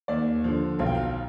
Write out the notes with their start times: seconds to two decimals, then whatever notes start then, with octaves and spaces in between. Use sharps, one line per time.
0.08 D#2 D5
0.44 D3 F3
0.79 B1 F5
0.86 G5
0.95 F5